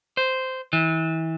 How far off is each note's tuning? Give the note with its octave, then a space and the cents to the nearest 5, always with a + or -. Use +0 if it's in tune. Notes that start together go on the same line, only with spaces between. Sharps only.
C5 -10
E3 -30